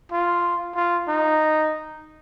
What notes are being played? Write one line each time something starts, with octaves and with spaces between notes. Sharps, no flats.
F4
F4
D#4